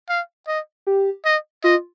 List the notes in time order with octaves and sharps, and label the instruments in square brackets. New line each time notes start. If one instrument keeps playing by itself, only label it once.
[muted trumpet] F5
D#5
[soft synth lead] G4
[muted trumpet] D#5
[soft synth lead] F4 [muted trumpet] D#5